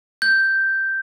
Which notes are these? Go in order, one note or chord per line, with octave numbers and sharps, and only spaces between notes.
G6